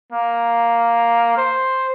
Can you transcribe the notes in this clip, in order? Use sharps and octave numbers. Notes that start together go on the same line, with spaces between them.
A#3
C5